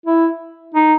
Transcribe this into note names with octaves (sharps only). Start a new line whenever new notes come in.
E4
D#4